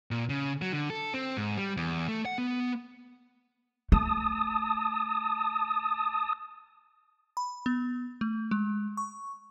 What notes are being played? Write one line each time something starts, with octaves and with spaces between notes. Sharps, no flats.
A#2
C#3
F#3
D3
A4
C4
G#2
G3
E2
A3
F#5
B3
A3 A5 D#6
B5
B3
A3
G#3
C#6